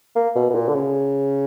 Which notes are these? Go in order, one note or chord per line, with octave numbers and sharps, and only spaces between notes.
A#3
B2
B2
A#2
D3
C#3